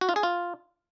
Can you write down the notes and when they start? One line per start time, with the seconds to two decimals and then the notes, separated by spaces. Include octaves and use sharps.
0.01 F#4
0.09 F4
0.16 G#4
0.23 F4